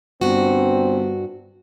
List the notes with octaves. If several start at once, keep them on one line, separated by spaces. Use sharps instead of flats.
G1 G2 C4 F#4